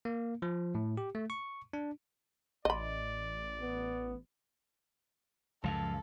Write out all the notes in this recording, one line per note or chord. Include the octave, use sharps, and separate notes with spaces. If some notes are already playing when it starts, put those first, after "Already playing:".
A#3
F3
A2
G4
A3
C#6
D4
A1 D5 D#5 B5
B3
C#2 F#2 F3 A4 F5